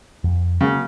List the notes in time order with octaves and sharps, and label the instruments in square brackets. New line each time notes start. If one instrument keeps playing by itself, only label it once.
[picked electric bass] F2
[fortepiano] C#3 [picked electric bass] F#3 A#3